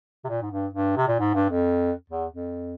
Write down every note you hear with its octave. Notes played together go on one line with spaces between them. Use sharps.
C3
A#2
G#2
G2
G2
C3
A#2
G#2
G2
F2
E2
F2